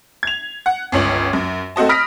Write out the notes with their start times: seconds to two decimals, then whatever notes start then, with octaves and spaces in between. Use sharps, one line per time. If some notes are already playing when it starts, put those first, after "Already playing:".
0.23 G#6 F7
0.66 F#5
0.92 G1 C#2 C#5 F#7
1.33 F#2
1.76 A3 C4 F#4 D#5 A5
1.89 B5 D#6 F6 A#6 B6 D7